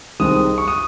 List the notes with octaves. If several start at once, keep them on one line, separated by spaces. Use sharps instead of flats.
C2 C3 D#3 G#3 D#6
C#6
D#6